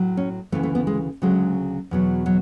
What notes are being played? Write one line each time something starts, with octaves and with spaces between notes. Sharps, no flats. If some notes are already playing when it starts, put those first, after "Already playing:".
Already playing: A2 F#3
C#4
D2 C#3 E3 A3
A3
B3
G#3
D2 C#3 F#3 G#3
E2 B2 F#3
F#3